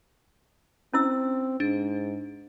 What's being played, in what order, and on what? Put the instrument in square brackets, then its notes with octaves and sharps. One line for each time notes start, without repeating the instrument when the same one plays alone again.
[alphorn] C4 [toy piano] C#4 E4 E6
[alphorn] G#2 [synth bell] D4